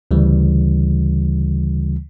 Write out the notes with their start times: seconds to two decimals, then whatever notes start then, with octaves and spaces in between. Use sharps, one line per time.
0.11 D2 C#3 E3 G3